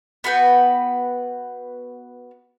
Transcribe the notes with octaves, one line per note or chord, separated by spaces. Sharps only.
B3 F#4 B4 G5